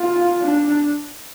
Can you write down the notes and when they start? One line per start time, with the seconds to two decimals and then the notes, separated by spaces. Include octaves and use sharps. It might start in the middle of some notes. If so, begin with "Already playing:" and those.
Already playing: F4
0.41 D4